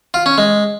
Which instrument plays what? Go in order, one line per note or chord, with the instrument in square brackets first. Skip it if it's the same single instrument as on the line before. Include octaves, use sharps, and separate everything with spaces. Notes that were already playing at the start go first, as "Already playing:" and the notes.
[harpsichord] F4
C#4
G#3